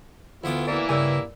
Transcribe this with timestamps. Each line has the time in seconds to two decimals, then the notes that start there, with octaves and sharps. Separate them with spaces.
0.44 D2 B3 E4 F4 D6
0.68 E3 A#3 E4 D5
0.89 G2 C#3 A#4 D5 G#5 E6